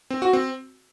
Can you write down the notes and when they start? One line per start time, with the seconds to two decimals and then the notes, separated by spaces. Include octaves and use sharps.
0.10 C4
0.22 F#4
0.33 C4